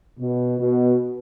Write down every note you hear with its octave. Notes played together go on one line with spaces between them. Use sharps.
B2
B2